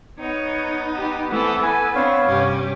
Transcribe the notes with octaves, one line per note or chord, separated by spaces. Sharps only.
B3 D#4 C#5
G4
E3 A3 C4 A4
A4 B4 G#5
C4 D4 C#5 F5
G2 C3 C#4 G4